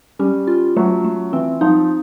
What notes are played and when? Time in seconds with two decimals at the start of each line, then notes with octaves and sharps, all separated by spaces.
0.19 G3 C#4
0.47 F4
0.77 F#3 A3
1.04 A3
1.33 E3 C4
1.61 F3 D#4